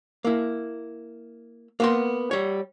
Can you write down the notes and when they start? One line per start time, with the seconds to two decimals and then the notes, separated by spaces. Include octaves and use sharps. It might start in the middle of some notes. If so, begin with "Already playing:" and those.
0.25 A#3 E4
1.80 A#3 B3 C6
2.31 G3 C#5